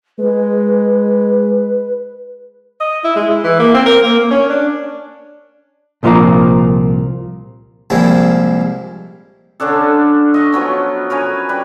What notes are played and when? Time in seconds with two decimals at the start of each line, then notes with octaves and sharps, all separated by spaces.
0.19 G#3 B4
2.80 D#5
3.04 E4
3.16 G#3
3.30 E4
3.44 E3
3.59 A#3
3.74 C4
3.86 A#4
4.03 A#3
4.19 A#3
4.31 C#4
4.49 D4
6.03 C2 A#2 F3 A#3 F5 A#5
7.90 C2 A#2 F3 G#3 E4
9.60 D3 C#4 D4 A4
10.34 D#5 C#6
10.52 F3 F#3 B3 C#4
11.10 A#4 B4 C#5 G#5
11.49 G3 B4